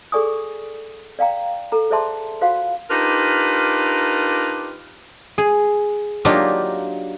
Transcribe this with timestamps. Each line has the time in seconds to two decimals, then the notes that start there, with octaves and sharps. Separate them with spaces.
0.12 G#4 A4 D5 G#5 C#6 D#6
1.19 D5 F5 G5 A#5
1.72 A4 A#5
1.90 G#4 C5 D5 E5 A5 C6
2.41 F4 F#4 C5 F5 F#5 C6
2.91 D4 D#4 F4 G4 A#4 B4
5.38 G#4
6.25 F#3 A#3 D4 D#4 F4 G4